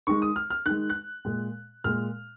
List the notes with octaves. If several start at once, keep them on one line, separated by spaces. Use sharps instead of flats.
D#3 G#3 C#6
D#6
F6
F6
D#3 G#3 F#6
F#6
A#2 G#3
A#2 G#3 F6